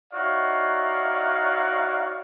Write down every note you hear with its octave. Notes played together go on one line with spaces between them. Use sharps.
D#4 E4 F#4 C#5 D5 F5